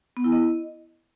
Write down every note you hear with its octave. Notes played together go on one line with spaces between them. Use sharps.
B3
E4
D#5